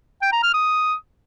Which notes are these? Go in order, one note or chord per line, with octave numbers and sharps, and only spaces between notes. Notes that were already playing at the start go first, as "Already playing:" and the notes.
G5
A#5
F6
D#6